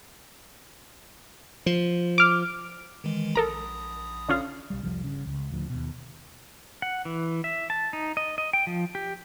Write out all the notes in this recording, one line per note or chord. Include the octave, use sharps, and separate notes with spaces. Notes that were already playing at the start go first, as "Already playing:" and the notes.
F3
D6 F6
D#3 E3 G#3
A#1 A4 A#4 A#5 D#6
D3 C#4 F4
B1 G3
F1 C2 F3 G3
G1 G2 C#3
C#2
D1 D2 F3
D#2 B2
F#5
E3
E5
A5
D#4
D#5
D#5
G5
F3
G4